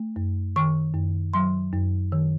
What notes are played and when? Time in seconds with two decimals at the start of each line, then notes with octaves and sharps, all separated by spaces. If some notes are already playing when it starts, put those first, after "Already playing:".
Already playing: A3
0.16 F#2
0.56 D#3 C#6
0.94 F#2
1.34 F#3 C6
1.73 F#2
2.12 D#3